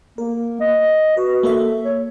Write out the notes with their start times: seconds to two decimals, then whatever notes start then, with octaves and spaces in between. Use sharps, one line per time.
0.18 A#3 A#4
0.60 D#5
1.17 F#4 B4
1.43 A#3 A4 E5
1.85 C#5